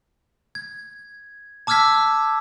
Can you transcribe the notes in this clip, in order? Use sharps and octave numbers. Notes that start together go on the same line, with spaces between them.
G#6
A5 D6 E6 F6 G#6 B6